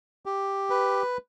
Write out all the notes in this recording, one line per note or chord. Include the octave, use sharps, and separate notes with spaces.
G4
B4